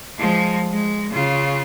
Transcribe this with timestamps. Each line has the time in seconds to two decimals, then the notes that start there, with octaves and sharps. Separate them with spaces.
0.19 F3 G#3
0.71 G#3
1.12 C#3 F4